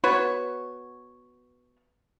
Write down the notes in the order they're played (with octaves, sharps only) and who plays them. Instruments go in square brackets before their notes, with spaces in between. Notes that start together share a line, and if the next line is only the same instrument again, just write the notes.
[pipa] B3 F#4 B4 C#5